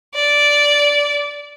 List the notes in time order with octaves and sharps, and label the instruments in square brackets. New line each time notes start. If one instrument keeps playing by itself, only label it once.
[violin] D5